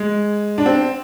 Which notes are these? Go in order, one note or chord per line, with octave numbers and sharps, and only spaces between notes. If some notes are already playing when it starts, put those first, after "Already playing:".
Already playing: G#3
D4
C4